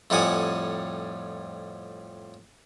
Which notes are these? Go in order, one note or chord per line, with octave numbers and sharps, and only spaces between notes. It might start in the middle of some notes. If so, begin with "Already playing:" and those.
F2 A2 G3 F#5 G#5 D#6